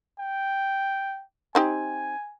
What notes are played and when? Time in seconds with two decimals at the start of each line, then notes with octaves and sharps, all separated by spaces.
0.19 G5
1.55 C4 D#4 G4 G#5